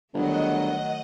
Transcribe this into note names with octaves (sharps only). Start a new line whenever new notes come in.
G1 D#3 F#3 A3 D#5 F#5